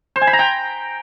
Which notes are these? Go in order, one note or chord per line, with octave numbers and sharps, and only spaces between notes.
C5
G#5
B5
A#5
G5